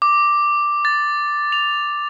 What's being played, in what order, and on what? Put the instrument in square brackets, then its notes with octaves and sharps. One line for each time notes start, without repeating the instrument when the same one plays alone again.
[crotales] D6
A6
F7